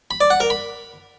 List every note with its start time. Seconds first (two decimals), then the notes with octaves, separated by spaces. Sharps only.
0.11 B5
0.21 D5
0.30 F#5
0.40 A#4
0.50 B5